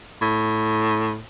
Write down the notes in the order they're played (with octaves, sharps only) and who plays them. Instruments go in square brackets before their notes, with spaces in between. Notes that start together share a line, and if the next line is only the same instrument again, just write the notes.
[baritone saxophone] A2